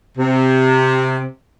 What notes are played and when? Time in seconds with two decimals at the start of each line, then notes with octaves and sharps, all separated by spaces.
0.17 C3